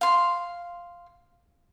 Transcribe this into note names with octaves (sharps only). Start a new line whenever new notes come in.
F5 C6